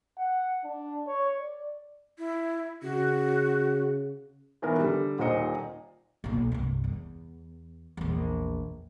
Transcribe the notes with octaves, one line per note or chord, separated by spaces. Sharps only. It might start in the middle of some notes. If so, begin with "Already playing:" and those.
F#5
D4
C#5
D5
E4
C#3 F#4
D#3 E3 B3 A#4
D3 G3
D#1 A#2 D#4 C5 D#5 C#7
B1 A#2
C2 G2
E2
A#1 E2